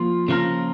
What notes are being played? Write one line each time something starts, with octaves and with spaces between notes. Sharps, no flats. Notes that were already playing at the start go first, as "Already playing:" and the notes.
Already playing: F3 A#3 F4
C#3 F3 A#3 F4 A#4